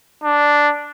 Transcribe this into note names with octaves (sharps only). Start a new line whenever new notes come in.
D4